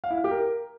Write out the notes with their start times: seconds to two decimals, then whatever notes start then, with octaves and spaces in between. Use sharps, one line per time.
0.04 F5
0.10 E4
0.17 F5
0.24 G4
0.31 A#4